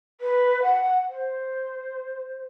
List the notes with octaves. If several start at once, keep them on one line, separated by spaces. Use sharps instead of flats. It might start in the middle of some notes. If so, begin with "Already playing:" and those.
B4
F#5
C5